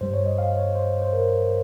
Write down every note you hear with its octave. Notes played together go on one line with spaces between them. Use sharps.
G2 G3 C5
C#5
D#5
F5
C#5
C5
C5
A#4